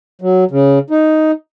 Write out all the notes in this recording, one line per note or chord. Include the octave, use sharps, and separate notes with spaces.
F#3
C#3
D#4